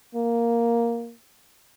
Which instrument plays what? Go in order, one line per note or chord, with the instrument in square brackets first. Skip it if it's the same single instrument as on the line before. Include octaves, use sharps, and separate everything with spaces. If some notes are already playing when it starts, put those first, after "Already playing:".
[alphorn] A#3